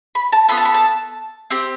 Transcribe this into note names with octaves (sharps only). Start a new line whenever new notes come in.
B5
A5
B3 F4 A4 B5
A5
B5
A5
C4 G4